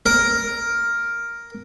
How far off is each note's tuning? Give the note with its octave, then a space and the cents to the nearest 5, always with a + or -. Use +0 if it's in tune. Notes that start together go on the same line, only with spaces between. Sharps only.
A#4 +5